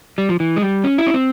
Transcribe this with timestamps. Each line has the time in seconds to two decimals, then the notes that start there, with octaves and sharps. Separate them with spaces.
0.18 G3
0.29 F3
0.40 E3
0.56 G#3
0.62 G3
0.84 C#4
0.98 E4
1.07 C#4
1.14 C4